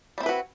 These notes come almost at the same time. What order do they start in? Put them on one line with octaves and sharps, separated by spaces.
G3 C4 E4 B4 F#4